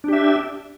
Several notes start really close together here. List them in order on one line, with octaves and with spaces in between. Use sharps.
D4 G4 E5